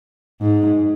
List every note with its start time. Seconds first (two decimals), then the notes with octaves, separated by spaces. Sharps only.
0.40 G#2